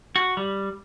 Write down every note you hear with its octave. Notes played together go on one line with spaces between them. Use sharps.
F#4
G3